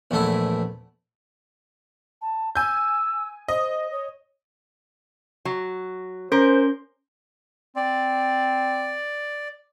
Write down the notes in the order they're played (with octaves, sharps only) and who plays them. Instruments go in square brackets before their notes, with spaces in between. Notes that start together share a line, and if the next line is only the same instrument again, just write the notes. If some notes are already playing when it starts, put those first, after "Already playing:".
[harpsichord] A#1 E2 A3 E4
[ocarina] A5
[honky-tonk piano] G#5 G6 [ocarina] E6
[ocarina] C5 [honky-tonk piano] D#5
[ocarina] C#5
[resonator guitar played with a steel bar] F#3
[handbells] C#4 C6 [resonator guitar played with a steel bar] A#4 [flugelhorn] C5
[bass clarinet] C4 [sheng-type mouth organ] D5